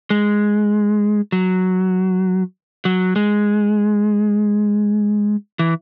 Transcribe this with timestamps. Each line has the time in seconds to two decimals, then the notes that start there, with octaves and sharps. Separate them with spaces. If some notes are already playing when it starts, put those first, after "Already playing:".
0.10 G#3
1.32 F#3
2.85 F#3
3.16 G#3
5.59 E3